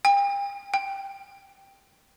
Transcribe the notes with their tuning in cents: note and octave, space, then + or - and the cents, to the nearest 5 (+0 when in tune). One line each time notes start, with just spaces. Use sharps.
G5 +40
G5 +0